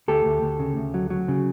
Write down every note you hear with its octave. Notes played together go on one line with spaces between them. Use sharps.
D2 G4 A4
D2
D2
C#3
D2
F#3
F#3
C#3